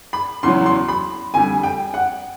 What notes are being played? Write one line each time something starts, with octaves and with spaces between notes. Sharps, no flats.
B5
E2 C#3 F#3 C6
C6
B5
F2 D3 G3 G#5
G5
F#5